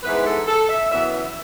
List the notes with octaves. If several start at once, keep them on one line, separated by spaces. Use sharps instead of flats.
G#2 E3 B3 B4
A4
A4
E5
F#2 E3 B3 E5
E5